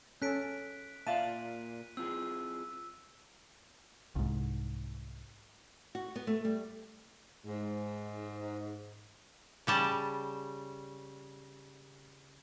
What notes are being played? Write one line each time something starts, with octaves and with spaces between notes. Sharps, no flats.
C#4 A4 F#6 B6 D7
A#2 F4 D5 E5 F5 A5 D#7
C4 F4 G#4 E6
C2 G#2
F#4
B3
A3
G3
G#2
C#3 G3 A5